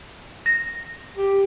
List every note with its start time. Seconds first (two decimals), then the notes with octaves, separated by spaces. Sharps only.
0.46 A#6
1.16 G4